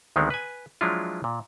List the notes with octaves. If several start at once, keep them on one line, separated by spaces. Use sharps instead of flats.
D2 D#3 G#3 B3 C4 D4
B4 G#5
F3 F#3 G#3 D4 E4 F4
A#2